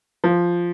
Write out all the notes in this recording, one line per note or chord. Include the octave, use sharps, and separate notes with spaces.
F3